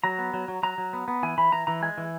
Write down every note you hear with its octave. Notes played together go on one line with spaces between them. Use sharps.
F#3 A#5
B3
F#3
F#3
F#3 A#5
F#3
B3
B3
E3 G#5
E3 B5
E3 A#5
E3 A#5
G#3 G#5
E3